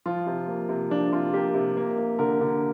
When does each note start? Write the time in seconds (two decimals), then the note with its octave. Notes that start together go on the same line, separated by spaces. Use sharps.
0.06 F3 F4
0.27 C3
0.48 A#3
0.69 C3
0.90 F3 D4
1.12 C3 F4
1.34 A#3 G4
1.54 C3
1.77 A#3
1.98 A#3
2.19 D3 A#4
2.41 D3